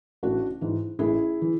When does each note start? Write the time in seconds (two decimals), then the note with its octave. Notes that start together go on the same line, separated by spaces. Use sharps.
0.23 A1 D4 F#4
0.61 G#2 E3
0.99 A1 E4 G#4
1.42 E3